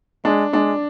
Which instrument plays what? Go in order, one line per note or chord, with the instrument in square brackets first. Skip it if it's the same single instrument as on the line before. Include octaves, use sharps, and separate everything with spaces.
[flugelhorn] G#3 [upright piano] D4
[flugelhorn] G#3 [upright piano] D4